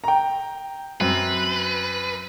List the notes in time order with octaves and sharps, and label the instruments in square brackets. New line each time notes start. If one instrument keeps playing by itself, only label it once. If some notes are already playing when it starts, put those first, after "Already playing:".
[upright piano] G5 A#5
[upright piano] F#2 C4 [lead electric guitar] B4